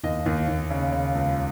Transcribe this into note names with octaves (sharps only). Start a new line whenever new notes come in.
D#2 D#5
D#2
D#2
C#3
C#3
C#2